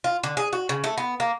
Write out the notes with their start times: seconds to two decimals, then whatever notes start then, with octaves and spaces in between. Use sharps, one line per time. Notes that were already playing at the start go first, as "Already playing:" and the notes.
0.04 F4
0.23 D3
0.37 G#4
0.53 F#4
0.69 C#3
0.84 A3
0.98 B3
1.20 A#3